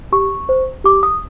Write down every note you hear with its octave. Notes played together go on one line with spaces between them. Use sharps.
G4 C#6
C5
G4 D6
D#6